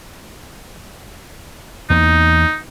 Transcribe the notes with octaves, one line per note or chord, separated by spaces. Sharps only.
E2 A#3 D#4